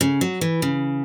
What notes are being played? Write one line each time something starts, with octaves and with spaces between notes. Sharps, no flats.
C#3
F#3
E3
C#3